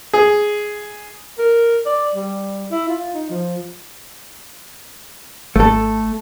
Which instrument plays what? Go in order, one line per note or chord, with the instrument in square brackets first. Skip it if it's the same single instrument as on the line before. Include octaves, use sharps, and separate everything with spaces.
[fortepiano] G#4
[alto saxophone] A#4
D5
G3
E4
F4
D#4
F3
[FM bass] G#1 [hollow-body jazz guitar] A3 A4